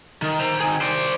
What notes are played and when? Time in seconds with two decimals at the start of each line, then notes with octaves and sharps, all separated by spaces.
0.22 D#3
0.39 C5 A#5
0.60 D#3 G#4
0.81 C5 D5